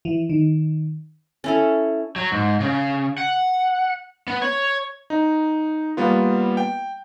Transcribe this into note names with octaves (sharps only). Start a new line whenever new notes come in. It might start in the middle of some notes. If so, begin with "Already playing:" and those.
E3
D#3
C#4 E4 A4
F#3
G#2
C#3
F#5
B3
C#5
D#4
G3 A#3 B3 F4
G5